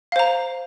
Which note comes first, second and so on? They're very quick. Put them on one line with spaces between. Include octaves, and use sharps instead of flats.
F5 C5 A#5